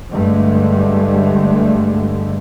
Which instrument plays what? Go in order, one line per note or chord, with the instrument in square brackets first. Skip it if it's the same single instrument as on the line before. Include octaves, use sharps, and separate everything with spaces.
[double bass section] G2 D3 G#3 A3